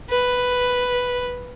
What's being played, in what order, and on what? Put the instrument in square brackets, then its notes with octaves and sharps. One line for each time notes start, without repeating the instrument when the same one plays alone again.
[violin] B4